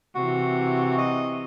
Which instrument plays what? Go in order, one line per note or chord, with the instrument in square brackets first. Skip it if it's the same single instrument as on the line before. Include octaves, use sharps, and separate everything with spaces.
[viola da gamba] C3 E3 [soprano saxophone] F#4
[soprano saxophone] D#5